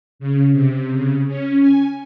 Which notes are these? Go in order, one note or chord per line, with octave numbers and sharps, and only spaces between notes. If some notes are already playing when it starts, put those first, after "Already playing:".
C#3
C3
C#3
C#4
G#5